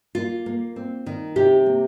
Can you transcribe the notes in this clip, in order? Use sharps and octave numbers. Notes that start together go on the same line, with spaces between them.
A#3 F4
A#3
C4
D#3
C3 G4
A#3